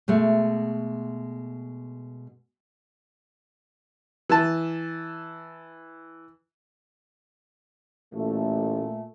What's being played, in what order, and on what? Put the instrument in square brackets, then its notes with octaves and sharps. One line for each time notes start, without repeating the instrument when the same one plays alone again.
[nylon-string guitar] B2 G#3 A3
[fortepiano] E3 A5
[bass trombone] A1 [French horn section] A#2 A3